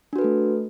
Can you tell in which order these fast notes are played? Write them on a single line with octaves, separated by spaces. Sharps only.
D4 F#4 B4 A4 A3